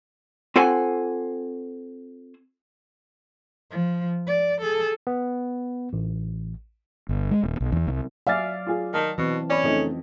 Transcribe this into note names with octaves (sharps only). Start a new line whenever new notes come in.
C4 F4 A4 C5 F#5 G#5
F3
D5
G#4 A4
B3
A1
G1
G#3
D#1
B1
E2
C2
F#3 D5 E5 F5 G#5 A6
F4 G#4
D#3 A5
B2 E3 C4
C#4 D5 B5
F2 C#3 A3 D#4